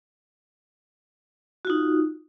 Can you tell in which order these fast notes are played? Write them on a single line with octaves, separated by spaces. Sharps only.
F#4 F4 D#4